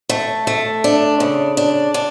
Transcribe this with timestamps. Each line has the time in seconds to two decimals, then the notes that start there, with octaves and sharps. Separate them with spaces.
0.09 A3
0.47 A3
0.84 D4
1.20 C#3
1.57 D4
1.94 D4